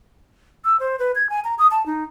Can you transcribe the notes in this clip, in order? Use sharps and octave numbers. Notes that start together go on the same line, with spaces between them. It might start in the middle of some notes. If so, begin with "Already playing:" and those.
E6
C5
B4
G#6
G#5
A#5
D#6
A5
D#4